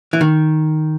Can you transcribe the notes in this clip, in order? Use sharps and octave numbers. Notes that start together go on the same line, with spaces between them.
E3
D#3